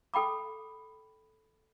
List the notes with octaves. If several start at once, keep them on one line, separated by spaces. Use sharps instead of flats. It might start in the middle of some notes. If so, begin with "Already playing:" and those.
A4 G5 B5 D6